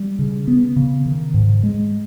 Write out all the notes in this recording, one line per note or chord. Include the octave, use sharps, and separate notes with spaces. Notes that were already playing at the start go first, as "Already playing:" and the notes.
Already playing: G3
C#3
B3
C#3
D#3
G#2
G#3